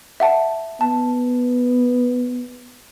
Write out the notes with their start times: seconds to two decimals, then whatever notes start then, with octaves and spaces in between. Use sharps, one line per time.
0.20 E5 F#5 A5
0.81 B3 A5